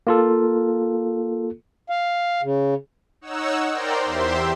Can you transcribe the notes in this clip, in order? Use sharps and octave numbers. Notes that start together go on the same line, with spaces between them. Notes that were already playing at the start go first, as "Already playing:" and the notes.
A#3 F4 A4
F5
C#3
D#4 C#5 F#5 E6
A#4 C5 D5 G5 A#5 C6
E2 G4 C5 E5 C6